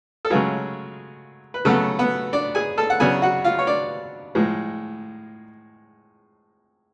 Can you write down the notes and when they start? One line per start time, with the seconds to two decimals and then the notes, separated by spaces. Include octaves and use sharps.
0.25 A4
0.30 C#3 F#3 G#3 A3 F4 G#4
1.54 B4
1.65 C#3 F#3 A3 B3 A4
1.99 B3 B4
2.33 D4 D5
2.55 G#4 G#5
2.78 A4 A5
2.90 F#5
3.00 C#3 F#3 B3 D4 G#4 G#5
3.22 F#4 F#5
3.44 F4 F5
3.59 C#5
3.67 D4 D5
4.35 A2 F3 G#3